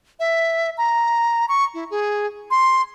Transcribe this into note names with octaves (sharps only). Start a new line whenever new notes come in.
E5
A#5
C#6
E4
G#4
C6